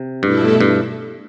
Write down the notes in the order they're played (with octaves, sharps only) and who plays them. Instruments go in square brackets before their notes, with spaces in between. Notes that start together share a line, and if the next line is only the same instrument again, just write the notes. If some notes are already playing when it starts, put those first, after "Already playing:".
Already playing: [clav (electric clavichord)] C3
[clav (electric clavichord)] G2 [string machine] B2 A3 E4 A4
[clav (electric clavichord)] G2